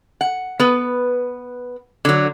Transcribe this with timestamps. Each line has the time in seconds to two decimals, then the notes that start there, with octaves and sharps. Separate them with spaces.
0.21 F#5
0.60 B3 B4
2.05 D3 F#3